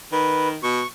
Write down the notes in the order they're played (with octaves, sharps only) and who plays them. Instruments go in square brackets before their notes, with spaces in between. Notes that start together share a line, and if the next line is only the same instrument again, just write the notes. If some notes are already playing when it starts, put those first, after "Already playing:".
[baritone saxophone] D#3 [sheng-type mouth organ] B4
[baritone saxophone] B2 [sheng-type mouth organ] C#6